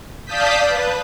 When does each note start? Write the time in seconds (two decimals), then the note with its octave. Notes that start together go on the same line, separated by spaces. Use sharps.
0.25 D5 F5 A5 D#6 G6 B6
0.67 B4